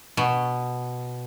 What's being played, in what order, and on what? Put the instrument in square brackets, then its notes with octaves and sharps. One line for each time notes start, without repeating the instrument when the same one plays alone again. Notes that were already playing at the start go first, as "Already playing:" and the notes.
[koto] B2